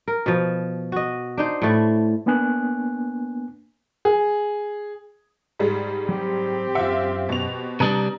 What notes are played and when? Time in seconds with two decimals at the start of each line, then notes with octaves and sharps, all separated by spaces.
0.08 A#4
0.26 B2 F3
0.92 F#4 D#5
1.38 D4 D#4 C5
1.62 A2 A3 E4
2.26 A#3 B3 D4 G#5 F#6
4.05 G#4
5.59 G#2 G3 G#3
6.09 F#3 C4 G4
6.75 F#2 D#3 F4 E5 F#5
7.29 B2 F7
7.80 C3 G3 D4 B4 A5 A#5 D#6 F#7